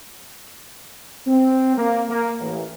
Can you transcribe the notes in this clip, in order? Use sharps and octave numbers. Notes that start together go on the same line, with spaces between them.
C4
A#3
A#3
A1